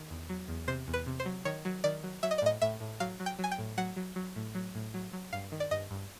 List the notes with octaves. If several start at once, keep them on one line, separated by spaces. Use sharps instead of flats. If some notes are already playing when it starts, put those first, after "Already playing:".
Already playing: D#3
E2
F#3
E2
C3 C5
E2
B4
C3
C5
F#3
D#3 C#5
F#3
D#3 D5
F#3
F#3 E5
D#5
D5
A2 D#5
A2 E5
A2
F#3 F5
F#3
G5
F#3 G#5
G5
A2
F#3 F#5
F#3
F#3
A2
F#3
A2
F#3
F#3
G2 F5
D#3
D5
G2 D#5
G2